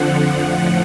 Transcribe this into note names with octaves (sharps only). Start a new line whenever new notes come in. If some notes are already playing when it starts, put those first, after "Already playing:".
Already playing: F2 D3 F3 F#5
A2 F3